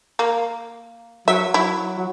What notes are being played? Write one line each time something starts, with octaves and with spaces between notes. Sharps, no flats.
A#3
F#3 E5
F#3 E4
F#3